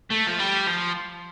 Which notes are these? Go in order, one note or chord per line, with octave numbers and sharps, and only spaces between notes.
A3
F3
G3
F3